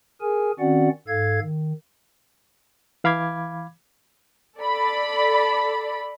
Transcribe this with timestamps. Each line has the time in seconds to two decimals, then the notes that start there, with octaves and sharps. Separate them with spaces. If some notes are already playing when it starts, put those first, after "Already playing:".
0.21 G#4 A#4 G#5
0.59 D#3 C4 C#4 F#4 D5 F#5
1.08 G#2 A4 F5 G#6
1.41 D#3
3.04 E3 F5 B5 D6 G#6
4.57 A4 D5 B5